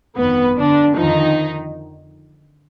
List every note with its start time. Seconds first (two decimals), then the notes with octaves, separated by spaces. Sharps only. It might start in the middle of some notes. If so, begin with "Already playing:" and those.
0.18 G1 F2 D#3 B3 B4
0.58 D3 D4
0.96 F2 D3 D#3 F3 D#4